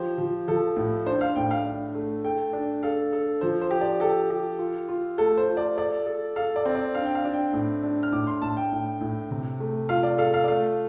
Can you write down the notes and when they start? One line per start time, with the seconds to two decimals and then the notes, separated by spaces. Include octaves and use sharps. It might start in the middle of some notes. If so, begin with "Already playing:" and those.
Already playing: F3 G4 C5
0.18 F3
0.48 F3 A4
0.76 A2
1.06 D4 C5
1.21 F5
1.36 A2 G5
1.51 F5
1.66 D4
1.95 A3
2.24 A4 G5
2.53 D4
2.83 A4 F5
3.13 A4
3.41 F3 C5
3.61 C5
3.71 G4
3.81 D5
4.00 G4 A4
4.30 G4
4.59 F4
4.89 F4
5.18 A3 A4
5.38 C5
5.48 F4
5.57 D5
5.77 A4 D5
6.06 A4
6.36 A4 F5
6.56 D5
6.65 C4
6.75 D5
6.95 D4 F5
7.05 G5
7.15 F5
7.25 D4
7.34 G5
7.53 A2
7.83 D4
8.03 F6
8.12 A2 D6
8.27 C6
8.42 A2 A5
8.57 G5
8.72 A2
9.01 A2
9.31 C3
9.60 A3
9.89 F4 F5
10.03 D5
10.18 A4 F5
10.34 F5
10.44 D5
10.47 A3 F5